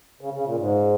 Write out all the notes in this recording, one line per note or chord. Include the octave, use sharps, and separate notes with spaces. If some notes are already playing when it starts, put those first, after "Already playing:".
C#3
C#3
A#2
G#2